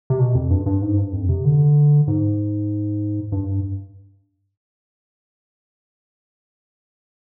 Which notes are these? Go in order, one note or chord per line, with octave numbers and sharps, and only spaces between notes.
C3
B2
F2
G2
G2
G#2
G2
F2
C3
D3
G#2
G2